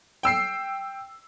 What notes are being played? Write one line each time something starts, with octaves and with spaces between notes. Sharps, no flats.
G5 E6 C7